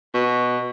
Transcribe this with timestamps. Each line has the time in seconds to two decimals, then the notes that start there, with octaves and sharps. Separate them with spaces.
0.14 B2